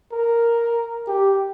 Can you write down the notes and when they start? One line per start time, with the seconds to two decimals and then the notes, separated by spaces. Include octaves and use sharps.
0.12 A#4
1.08 G4